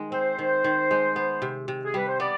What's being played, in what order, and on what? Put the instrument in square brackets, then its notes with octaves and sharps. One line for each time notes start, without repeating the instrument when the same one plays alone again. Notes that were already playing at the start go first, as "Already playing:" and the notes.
Already playing: [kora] D#3 G#3
[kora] C4 [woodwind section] C5
[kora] D#3
D#3
G#3
B3
C3
C3
[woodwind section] G#4
[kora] G3 [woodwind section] B4
[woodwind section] C5
[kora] B3 [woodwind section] D5